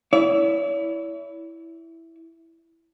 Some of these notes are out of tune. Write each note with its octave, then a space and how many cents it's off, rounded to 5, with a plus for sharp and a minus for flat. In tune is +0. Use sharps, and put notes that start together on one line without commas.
E4 +0 C#5 +45